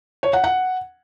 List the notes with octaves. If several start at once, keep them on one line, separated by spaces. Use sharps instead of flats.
C#5
F#5
F#5